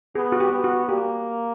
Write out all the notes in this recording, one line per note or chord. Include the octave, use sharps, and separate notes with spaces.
B3 G#4
F#4
G4
B3
F#4
A#3 G4